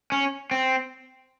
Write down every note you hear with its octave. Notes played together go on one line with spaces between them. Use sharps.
C#4
C4